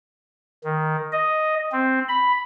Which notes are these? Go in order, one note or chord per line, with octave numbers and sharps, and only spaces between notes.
D#3
D#5
C4
B5